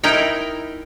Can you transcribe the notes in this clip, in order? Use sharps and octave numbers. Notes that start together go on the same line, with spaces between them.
D#4 E4 A#4 G5